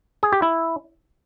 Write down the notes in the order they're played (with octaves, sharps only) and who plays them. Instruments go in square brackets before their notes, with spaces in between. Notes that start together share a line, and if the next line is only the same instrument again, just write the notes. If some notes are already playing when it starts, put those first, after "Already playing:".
[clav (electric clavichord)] G#4
G4
E4